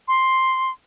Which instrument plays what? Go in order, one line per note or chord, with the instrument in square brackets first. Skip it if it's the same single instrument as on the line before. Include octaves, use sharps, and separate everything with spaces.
[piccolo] C6